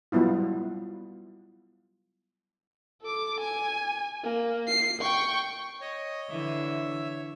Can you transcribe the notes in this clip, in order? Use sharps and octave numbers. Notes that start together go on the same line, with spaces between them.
F#3 G3 B3 E4 F4
A4 D6
G#5
A#3
C7
G5 C#6
C#5 D#5
D3 E3 E5